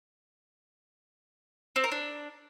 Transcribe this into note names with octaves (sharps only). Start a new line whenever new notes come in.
C4
A#4
D4